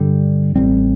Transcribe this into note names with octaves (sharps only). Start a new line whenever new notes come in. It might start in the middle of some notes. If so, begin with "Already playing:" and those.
Already playing: G2 D3 G3
A1 A2 G3 C4